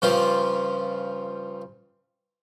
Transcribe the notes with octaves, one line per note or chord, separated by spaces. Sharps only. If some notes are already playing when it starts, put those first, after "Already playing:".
G2 C#3 F3 F4 G4